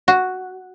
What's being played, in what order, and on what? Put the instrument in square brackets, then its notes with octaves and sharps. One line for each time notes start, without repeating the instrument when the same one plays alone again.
[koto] F#4